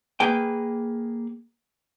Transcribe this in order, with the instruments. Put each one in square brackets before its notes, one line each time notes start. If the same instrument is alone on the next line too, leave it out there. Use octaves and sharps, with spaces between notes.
[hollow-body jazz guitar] A#3 G#4 B4 G5